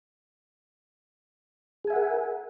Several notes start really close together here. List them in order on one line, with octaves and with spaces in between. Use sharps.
G#4 G#5 E5 F#5 A#4